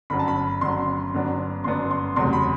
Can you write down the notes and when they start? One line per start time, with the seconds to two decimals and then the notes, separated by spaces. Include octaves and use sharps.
0.10 G1 F#2 F#3 B5
0.19 A5
0.28 B5
0.61 G1 F#2 F#3 C6
1.14 G1 F#2 F#3 B3 D4
1.64 G1 F#2 F#3 B3 D4 C6
1.91 C6
2.16 F#1 E2 C3 F#3 A3 C6
2.33 B5